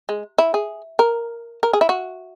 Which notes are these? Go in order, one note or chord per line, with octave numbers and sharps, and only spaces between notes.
G#3
E4
G#4
A#4
A#4
G#4
E4
F#4